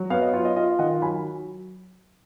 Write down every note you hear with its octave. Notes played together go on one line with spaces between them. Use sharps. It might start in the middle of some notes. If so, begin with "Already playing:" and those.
Already playing: F#3
B3 C#5 F5
D#5
F4 C#5
D#5
F4 D#5
D#3 D#5 F#5
F#3 G#5 B5